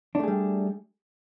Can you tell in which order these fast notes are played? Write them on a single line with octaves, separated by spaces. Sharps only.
D4 A3 G#4 G3